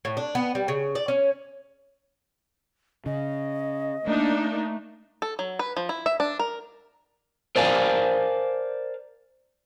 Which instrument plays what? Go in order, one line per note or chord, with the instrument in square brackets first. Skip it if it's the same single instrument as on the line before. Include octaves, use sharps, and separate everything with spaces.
[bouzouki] A2
D4
B3
G3
C#3
D5
C#4
[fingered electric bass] C#3 [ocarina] D#5
[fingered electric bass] A3 [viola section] A#3 D4 D#4
[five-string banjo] A4
F#3
B4
F3
E4
E5
D4
A#4
[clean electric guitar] A#4 C5 D5 F5 G#5 A5